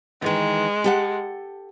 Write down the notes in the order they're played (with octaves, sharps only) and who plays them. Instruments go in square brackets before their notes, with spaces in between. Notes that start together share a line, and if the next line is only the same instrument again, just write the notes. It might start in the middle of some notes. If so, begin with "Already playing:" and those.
[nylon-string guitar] D#3 E3 [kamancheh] G#3
[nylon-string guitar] G4 A4 F#5